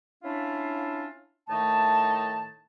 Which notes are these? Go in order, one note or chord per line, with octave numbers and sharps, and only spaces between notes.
C#4 D4 E4 F4 E5 F5
A2 D#3 A3 D#4 A5